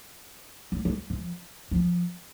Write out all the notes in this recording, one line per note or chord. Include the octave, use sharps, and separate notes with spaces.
F#3
F3
F3
F3